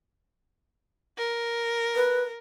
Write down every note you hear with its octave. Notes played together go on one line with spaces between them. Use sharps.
A#4
B4